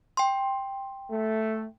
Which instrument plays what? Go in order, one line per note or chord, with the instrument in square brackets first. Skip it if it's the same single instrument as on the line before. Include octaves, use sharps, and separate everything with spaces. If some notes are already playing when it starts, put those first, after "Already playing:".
[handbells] G5 C6
[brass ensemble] A3